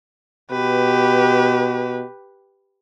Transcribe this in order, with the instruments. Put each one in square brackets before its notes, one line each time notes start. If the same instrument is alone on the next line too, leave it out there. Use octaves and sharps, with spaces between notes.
[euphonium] B2 [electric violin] G4 B4